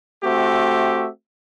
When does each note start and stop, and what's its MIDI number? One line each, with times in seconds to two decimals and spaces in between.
0.24 1.08 57
0.24 1.08 60
0.24 1.08 66
0.24 1.08 67
0.24 1.08 76